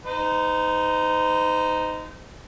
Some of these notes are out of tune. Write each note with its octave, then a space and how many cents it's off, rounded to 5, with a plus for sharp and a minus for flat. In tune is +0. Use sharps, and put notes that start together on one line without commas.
D#4 +0 C5 -35